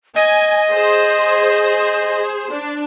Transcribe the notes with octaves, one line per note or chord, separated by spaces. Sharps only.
D#5 G#5
G#4 C5
D4